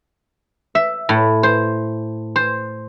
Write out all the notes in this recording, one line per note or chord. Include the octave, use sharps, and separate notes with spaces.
E5
A2
C5
C5